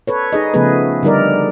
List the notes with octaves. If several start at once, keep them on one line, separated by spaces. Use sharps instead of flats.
A4 B4 C#5
D#4 G#4 D#5
C#3 F3 A3 B3 G#4 B4
D3 G3 D#4 A#4 D5